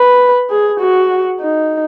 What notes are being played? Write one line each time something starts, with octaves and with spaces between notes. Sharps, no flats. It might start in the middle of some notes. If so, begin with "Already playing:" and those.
Already playing: B4
G#4
F#4
D#4